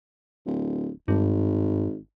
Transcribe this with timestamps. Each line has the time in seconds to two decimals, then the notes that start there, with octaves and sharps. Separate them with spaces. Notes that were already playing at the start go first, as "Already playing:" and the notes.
0.46 D1
1.08 G#1 G2